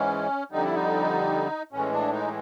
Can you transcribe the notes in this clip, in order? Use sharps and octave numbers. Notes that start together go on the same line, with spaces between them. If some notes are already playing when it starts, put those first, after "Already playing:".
Already playing: G#2 E3 G#3 C#4
F2 D3 G3 D#4
E4
D#4
A2 E3 G#3 C#4
D4
D#4